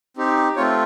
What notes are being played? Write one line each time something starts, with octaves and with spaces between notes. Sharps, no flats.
C4 D#4 G4
A3 C4 F4 C#5